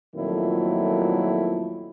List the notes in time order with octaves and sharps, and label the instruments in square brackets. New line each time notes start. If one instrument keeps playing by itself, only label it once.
[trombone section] F2 A#2 D#3 F#3 A3 E4